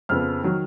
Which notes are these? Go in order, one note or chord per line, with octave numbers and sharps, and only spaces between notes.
F2 C#3 F3 B3 F6
D#3 F#3